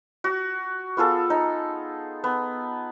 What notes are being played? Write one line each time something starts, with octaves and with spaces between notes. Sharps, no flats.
F#4
B3 F4 G#4 A4
D#4
B3